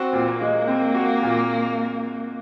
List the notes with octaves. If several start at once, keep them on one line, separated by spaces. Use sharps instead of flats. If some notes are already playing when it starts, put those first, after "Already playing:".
Already playing: C4 F#4
A#2
A#3
G#3
C4
F#4
A#2